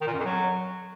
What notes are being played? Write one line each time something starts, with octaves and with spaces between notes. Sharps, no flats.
D#3
A#2
F#2
F2
F#3